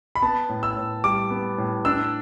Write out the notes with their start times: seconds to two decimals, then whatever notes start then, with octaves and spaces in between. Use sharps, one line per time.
0.15 B5
0.22 B3 A5
0.49 A2
0.63 E6
0.77 A2
1.04 G3 D6
1.30 B3
1.58 A2
1.85 D4 E6